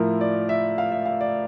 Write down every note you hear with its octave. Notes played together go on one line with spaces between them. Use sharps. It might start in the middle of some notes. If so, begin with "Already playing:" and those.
Already playing: A2 F3 E4 A#4
D5
E5
F5
E5
F5
D5